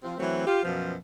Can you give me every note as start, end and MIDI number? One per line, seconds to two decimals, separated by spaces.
0.04 0.14 53
0.04 0.14 60
0.04 0.14 65
0.18 0.43 52
0.18 0.43 54
0.18 0.43 57
0.18 0.43 60
0.46 0.63 65
0.46 0.63 67
0.63 0.95 42
0.63 0.95 47
0.63 0.95 53